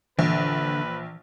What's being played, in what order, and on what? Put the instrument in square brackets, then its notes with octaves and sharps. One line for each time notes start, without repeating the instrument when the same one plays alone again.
[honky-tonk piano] A#1 [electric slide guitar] D3 [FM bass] E3 [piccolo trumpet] B4